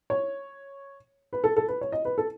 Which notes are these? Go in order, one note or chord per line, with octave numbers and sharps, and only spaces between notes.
C#5
B4
A4
A4
B4
C#5
D#5
B4
A4